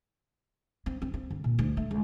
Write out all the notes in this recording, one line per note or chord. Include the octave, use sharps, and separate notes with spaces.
C4
C4
C4
D3
A#2
D2
A3
C#2